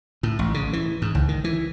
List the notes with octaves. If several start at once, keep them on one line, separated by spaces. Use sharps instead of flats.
A2
A1
C#3
E3
G#2
C#2
D#3
E3